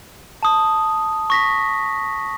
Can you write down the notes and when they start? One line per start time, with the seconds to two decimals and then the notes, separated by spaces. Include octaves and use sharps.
0.43 A5 D#6
1.30 C#6 A#6 B6